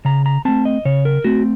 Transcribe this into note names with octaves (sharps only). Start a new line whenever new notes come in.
C#3 A#5
A#5
A3 C4 A5
D#5
C#3 C#5
A#4
A3 C4 F#4